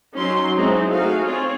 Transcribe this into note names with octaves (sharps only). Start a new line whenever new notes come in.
F#3 C#4 D#4 C6
F#3 G#3 C4 D#4 E4
A3 D#4 F#4 G#4 F5
C4 F4 C#5